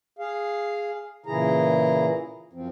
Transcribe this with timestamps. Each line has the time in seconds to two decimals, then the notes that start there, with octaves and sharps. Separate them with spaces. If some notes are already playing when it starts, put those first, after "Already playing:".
0.19 G#4 F5
1.26 A#2 C#3 E3 E4 G#4 A#5
2.53 F#2 F3 C4